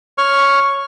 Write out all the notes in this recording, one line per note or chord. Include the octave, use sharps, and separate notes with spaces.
C#5 C#6 F6